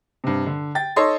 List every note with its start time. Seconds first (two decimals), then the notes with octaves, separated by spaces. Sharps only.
0.24 G2 C3
0.46 D3
0.75 G5 A6
0.96 D#4 A4 C#5 D#5 C6